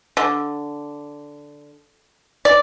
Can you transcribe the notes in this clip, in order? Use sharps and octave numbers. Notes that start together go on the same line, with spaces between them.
D3
D5